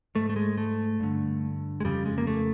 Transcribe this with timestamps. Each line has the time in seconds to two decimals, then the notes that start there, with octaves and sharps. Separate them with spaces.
0.15 G#2 A3
0.29 A3
0.36 G#3
0.58 A3
1.00 G2 D3
1.80 G#3
1.84 F2 C#3 G3
2.05 G#3
2.18 A#3
2.27 A3